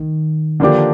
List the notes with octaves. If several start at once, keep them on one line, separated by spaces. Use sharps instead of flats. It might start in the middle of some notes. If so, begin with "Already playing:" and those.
Already playing: D#3
D3 F3 A#3 D4 G4